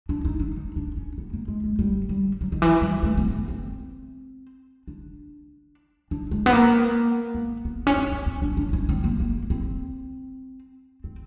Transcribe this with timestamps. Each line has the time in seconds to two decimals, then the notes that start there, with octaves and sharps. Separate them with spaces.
0.09 D4
0.25 D#4
0.40 D4
0.56 D#4
0.76 D4
0.97 C#4
1.18 B3
1.33 A#3
1.48 G#3
1.64 G#3
1.79 G3
2.09 G3
2.41 F#3
2.52 D#3
2.62 E3
2.82 G3
3.03 A3
3.17 B3
3.33 B3
3.48 C4
4.88 D4
6.11 D4
6.31 G#3
6.46 B3
6.53 A#3
7.34 B3
7.65 B3
7.87 C#4
7.96 C4
8.12 C#4
8.26 C4
8.42 D4
8.57 D4
8.73 C#4
8.89 C4
9.04 A#3
9.20 A#3
9.50 C4
11.04 C4